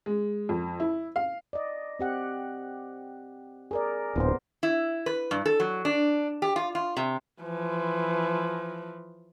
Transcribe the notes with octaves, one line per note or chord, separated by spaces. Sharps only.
G#3
F2
E4
F5
D5 D#5
C4 G4 F#5
G#4 A#4 D5
D1 A#2 B3 C5
E4
B4
G2
A4
F#3
D4
G4
F4
F4
C3
E3 F3